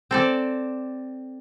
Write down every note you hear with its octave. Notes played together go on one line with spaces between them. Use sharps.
C4 A4 D5